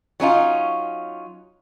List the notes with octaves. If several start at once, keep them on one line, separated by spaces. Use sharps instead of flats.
F#3 C#4 D#4 F4